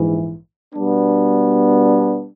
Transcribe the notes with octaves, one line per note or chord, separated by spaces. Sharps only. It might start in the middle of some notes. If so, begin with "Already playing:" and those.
Already playing: A#1 G#2 E3
B2 G3 B3 D4